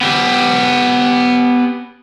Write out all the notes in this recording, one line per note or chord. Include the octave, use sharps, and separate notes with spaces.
B3 G4